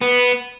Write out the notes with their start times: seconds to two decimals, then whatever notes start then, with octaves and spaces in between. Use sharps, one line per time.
0.01 B3